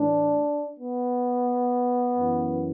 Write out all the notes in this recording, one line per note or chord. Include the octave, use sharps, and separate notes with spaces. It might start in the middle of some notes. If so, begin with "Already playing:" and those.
Already playing: A2 E3 D4
B3
F#2 E3